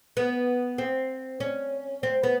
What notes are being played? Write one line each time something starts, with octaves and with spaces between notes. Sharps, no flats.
B3
C4
C#4
C4
B3